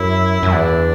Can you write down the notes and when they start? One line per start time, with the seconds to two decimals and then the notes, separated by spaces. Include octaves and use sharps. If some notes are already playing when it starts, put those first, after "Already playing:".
Already playing: F#2 E4
0.43 F#2 E4
0.53 E2 D4